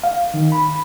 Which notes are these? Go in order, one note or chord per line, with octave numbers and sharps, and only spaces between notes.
F5
D#3
B5